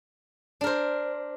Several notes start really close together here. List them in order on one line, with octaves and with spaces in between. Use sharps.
D4 A#4 C5